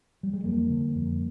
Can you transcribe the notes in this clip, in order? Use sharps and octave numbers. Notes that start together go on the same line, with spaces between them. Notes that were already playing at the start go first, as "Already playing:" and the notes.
G3
G#3
F2 G3 A#3
D3
F2